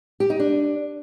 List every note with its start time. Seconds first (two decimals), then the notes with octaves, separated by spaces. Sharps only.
0.20 G4
0.30 D#4
0.40 D4